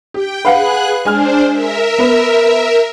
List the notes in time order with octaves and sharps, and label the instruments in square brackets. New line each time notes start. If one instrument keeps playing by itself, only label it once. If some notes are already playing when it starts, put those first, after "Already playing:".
[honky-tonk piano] G4 [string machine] G5
[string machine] G#4 F#6 [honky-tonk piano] B4 F5 F#5
[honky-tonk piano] G#3 G#5 F6 [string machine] D4 C5
[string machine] A#4 E5
[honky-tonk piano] B3 B4